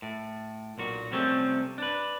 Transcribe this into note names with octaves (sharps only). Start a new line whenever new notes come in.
A2
B1 A#2 F#4
C3 F3 G3 A3 C4 C#4
D4 B4